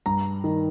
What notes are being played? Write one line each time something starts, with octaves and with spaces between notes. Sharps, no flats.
G2 A#5
D#3